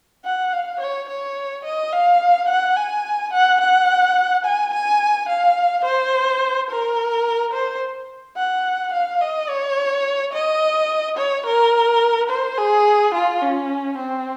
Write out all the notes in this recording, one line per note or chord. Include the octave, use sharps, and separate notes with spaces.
F#5
F5
C#5
C#5
D#5
F5
F#5
G#5
F#5
F#5
G#5
G#5
F5
C5
A#4
C5
F#5
F5
D#5
C#5
D#5
C#5
A#4
C5
G#4
F4
C#4
C4